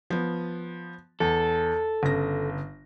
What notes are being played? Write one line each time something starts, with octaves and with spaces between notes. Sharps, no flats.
F3 B3
E2 A4
G1 C#3 A#6